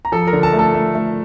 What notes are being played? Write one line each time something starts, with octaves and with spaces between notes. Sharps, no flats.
A#5
F3 A4 A5
A#4 A#5
D3
A4 A5
A3
A4 A5
A3
A3